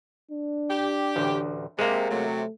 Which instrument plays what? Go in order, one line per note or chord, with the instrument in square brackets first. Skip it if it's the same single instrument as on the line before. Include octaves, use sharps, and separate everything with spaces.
[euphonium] D4
[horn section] G4
[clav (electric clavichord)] A1 D2
[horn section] C3 [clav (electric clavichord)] G#3 A#3
[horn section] C3 F#3 [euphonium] A3